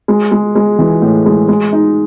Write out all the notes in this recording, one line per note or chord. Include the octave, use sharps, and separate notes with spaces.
G#3
G#3
G#3
E3
A2
G#3
G#3
D#4